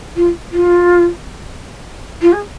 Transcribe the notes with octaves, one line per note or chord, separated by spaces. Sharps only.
F4
F4
F4
G#4